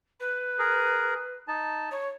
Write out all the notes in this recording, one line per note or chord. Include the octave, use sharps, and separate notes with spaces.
B4
G#4 A#4
D#4 A5
C#5